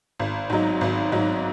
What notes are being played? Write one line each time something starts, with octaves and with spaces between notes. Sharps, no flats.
G#1
G#2 F#3 D#4
G#1
G#2 F#3 D#4